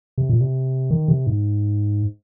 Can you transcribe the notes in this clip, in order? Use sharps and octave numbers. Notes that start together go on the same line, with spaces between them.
C3
A#2
C3
D#3
C3
G#2